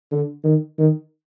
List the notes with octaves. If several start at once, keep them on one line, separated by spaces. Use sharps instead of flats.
D3
D#3
D#3